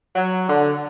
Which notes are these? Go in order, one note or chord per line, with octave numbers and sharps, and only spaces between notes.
F#3
D3